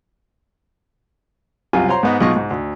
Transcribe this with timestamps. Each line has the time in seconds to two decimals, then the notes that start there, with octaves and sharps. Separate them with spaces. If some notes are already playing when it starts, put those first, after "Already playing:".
1.73 C2 F#2 C3 F4 G#5
1.89 C5 C#5 A#5 C6
2.03 G#2 B3 D#5
2.21 B1 G#3 D#4 F4 D#5 C#6
2.36 G#2
2.51 D2